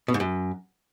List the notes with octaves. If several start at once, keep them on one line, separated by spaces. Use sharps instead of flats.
B2
G#2
F#2